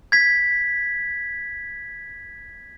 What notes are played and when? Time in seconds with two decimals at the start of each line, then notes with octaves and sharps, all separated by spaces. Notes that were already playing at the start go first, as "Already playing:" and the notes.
0.12 G#6 B6